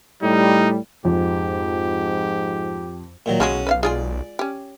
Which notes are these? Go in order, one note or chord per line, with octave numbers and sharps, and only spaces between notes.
A2 G3 D#4
F2 G#2 G4
A#2 D#3 F#3
B1 C#3 F#3 G#3 C#4 F#4 D#6
B4 E5 F5
G#3 F4 G#4 D5
C#4 G4